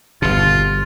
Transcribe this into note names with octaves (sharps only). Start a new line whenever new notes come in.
G1 B2 F4